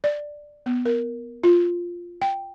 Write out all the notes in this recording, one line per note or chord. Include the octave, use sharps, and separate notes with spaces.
D5
B3
A#4
F4
G5